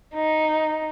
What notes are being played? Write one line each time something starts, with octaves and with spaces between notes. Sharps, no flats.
D#4